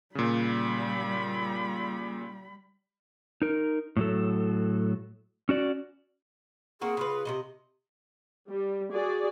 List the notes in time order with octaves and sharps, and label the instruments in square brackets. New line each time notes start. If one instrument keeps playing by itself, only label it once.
[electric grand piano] A#2 C#3 [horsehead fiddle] G3 B5
[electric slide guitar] D#4 A#4
A2 F#3 A4
C#4 F#4 D5
[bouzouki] A#3 C4 F#4 [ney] G#4
[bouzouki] C#3 F4 B4
C3 F3 D#5
[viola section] G3
F#4 G#4 D5